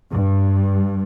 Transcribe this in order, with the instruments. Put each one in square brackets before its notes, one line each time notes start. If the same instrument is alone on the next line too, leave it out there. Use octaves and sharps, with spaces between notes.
[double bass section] G2